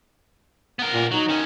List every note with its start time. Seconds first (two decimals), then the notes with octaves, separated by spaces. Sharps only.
0.79 B3 A#4
0.93 A#2
1.11 F#3 D#4
1.28 D#3 C#4